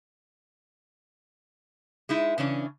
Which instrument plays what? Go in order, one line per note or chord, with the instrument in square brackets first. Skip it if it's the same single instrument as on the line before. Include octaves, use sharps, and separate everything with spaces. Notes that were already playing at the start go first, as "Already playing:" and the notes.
[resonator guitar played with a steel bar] G#3 D#4 E4
C#3 E3 C#4 D4